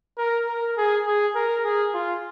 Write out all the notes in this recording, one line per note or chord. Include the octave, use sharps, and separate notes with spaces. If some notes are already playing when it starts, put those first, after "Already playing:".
A#4
A#4
G#4
G#4
A#4
G#4
F4